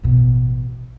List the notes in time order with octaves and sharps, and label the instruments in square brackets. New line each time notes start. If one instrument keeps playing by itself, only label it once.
[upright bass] A1 B2